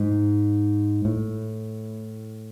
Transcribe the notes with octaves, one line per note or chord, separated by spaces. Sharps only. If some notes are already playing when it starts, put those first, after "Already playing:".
Already playing: G#2
A2